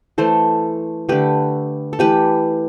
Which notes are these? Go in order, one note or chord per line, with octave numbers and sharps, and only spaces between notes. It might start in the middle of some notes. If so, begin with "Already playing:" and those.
E3 A3 A4 C5
D3 A3 G4 B4
A4
E3 A3 G4 B4